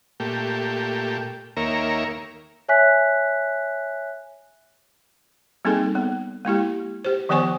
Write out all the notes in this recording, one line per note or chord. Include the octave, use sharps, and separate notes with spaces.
A#2 A3 G4
D#2 A#3 A#4 C#5 E5
C#5 E5 G#5 F#6 B6
G3 A#3 C4 D#4 G#4 A4
B3
G#3 A#3 E4 G4
G4 C5
D#3 F3 B3 C5 G#5 C#6